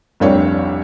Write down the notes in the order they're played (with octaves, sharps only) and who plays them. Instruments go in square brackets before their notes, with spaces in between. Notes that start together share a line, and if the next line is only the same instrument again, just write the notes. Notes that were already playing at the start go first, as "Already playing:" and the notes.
[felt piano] F1 C2 G3 D4 C#5 F5